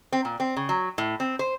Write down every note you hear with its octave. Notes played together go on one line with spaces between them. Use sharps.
C4
A#2
C4
C#3
F#3
A2
C4
C5